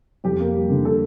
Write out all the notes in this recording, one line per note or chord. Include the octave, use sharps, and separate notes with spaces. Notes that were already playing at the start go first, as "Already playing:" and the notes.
F2 G4
A#3
G3
D3
A4